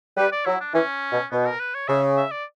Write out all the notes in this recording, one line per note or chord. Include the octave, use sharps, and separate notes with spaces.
G3 B4
D5
F#3 E4
D4
E3 C#4
B2
B2 B3
A#4
B4
C#5
C#3 E5
E5
D5